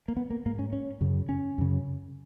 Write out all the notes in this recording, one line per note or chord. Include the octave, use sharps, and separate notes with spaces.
A#3
B3
A#3
G#2 A#3
C#4
C#4
F#2 C#3
C#4
F#2 C#3